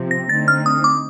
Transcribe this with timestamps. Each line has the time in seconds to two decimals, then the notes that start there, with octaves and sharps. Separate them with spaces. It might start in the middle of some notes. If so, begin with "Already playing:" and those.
Already playing: C3 F3 C4
0.11 A#6
0.29 D3 A3 C4 D#4 A6
0.48 F6
0.66 D#6
0.84 D6